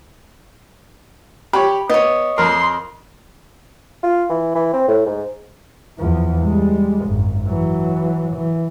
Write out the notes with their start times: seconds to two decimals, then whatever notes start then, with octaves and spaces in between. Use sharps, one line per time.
1.53 G4 C#5 B5
1.89 B3 C#5 D#5
2.38 F2 A#4 C6
4.03 F4
4.29 E3
4.55 E3
4.73 C4
4.88 A2
5.06 G#2
5.98 E2 F3
6.42 G3 G#3
7.05 G#1 F#2
7.47 E3 F#3
8.36 E3